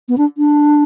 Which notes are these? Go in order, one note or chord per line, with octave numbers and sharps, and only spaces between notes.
B3
D4
D4